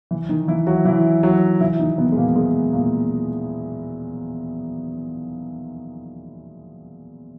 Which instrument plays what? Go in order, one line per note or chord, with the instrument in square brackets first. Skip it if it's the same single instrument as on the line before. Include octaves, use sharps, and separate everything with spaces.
[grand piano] E3 E4
D#3 D#4
E3 E4
F#3 F#4
E3 E4
F#3 F#4
E3 E4
D#3 D#4
B2 B3
G#3
A#2 A#3
G#3
A#2 A#3